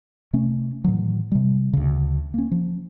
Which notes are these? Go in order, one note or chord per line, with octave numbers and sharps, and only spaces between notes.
C3 A3 C#4
A2 D#3 E3 F#3
C3 G3
D2 C#3
A#3 C#4
F3